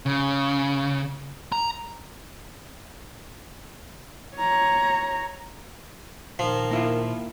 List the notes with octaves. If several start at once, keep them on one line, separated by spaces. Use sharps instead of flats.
C#3
A#5
C#5 A#5
A#2 D#3 F3
A#3 E4 F4